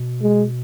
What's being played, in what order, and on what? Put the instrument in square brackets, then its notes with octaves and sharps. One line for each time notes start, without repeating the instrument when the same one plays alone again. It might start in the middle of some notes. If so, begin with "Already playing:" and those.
Already playing: [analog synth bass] B2
[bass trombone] G#3